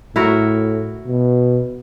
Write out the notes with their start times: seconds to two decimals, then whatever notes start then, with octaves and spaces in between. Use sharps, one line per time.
0.16 A2 E4 F#4 A#4
1.06 B2